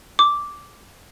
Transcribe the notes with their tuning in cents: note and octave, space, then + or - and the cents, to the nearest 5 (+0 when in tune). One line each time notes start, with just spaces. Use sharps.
D6 -5